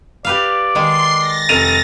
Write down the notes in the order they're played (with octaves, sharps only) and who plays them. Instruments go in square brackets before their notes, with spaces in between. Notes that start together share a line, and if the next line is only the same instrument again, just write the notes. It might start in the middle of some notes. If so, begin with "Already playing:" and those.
[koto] G4 B4 F5 [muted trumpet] D5
[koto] D#3 G#3 [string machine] C6 C7
[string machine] A6 A#6
[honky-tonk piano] F1 D#7 F7